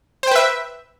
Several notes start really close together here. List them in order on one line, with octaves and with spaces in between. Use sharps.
C5 G5 B4 E5